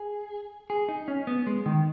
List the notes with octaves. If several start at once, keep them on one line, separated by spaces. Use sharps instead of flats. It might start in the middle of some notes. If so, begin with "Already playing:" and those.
Already playing: G#4
G#4
D#4
C#4
B3
G#3
D#3